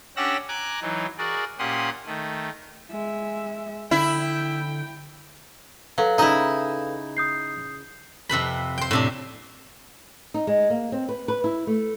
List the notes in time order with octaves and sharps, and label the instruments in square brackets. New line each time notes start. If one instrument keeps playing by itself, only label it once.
[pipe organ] C#4 D4 G4 F#5 E6 A#6
G#5 A#5 D6 F#6
E3 F#3 D#4
F#4 G#4 A#4 D5
A#2 C#4 G4 F#5 C6 D#6
D#3 A3
[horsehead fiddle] G#3 E5
[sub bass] D3 [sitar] E4 [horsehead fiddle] G5
[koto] F#3 [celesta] A4 B4 F5
[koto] C#3 E4 [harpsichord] D#4
[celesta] D#6 G6 C7
[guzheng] F2 C3 B4 B5
C5 G5
A2 C3 D4
[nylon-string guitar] D#4
G#3
A#3
C4
B4
B4
E4
A3